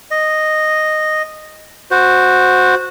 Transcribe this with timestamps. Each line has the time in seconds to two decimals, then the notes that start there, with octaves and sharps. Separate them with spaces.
0.11 D#5
1.91 F#4 C5